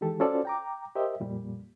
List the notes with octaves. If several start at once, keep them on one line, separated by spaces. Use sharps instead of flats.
D#3 E3 G#3 G4 A4
C#4 F4 F#4 A4 C5 D5
G5 A#5 D6
G4 A#4 C5 D#5 E5
F2 A#2 G3